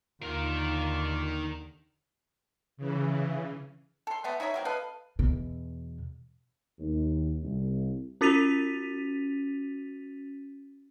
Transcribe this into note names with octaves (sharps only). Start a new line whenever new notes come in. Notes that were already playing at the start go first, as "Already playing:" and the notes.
D#2 D3 D#3 A#3 F4 A#4
C#3 E3
A4 C6
G#3 A3 B3
D#4 E4 C#5 E5
F#3 A#3 C4
A4 B4 D#5 F5
E2 B2
D#2
C2
C#4 F#4 A6 B6 D#7 F7